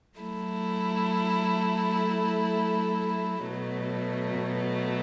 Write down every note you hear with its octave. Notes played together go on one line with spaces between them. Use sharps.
F#3 A3 E4
B2 F#3 A3